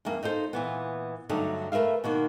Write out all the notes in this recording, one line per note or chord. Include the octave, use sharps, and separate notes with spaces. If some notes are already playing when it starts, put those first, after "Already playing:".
E2 G2 A#3
D#4 F4 A4 C5
A#2 E3 B3
G2 D3 F#3 A3 D#4
A3 A#4 B4 E5 F5
B2 D#3 A#3 F#4